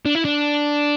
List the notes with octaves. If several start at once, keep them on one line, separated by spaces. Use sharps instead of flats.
D4
E4
D4